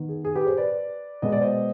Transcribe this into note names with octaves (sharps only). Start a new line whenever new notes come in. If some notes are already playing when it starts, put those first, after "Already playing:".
Already playing: D#3 B3
G#4
G#4
G4 B4
G#4 C5
B4 D5
B2 G#3 B3 D#5
D5
C5 D#5